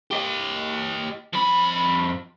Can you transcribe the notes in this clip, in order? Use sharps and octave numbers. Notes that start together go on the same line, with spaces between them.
G4 D#5
F2 B5